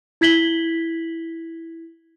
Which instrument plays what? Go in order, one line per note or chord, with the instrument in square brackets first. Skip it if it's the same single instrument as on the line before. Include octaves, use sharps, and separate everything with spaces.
[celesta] E4 G#6 B6 F#7 G7